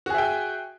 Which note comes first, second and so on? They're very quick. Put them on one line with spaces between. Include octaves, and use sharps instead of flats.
F#4 G#4 E5 G5 G#5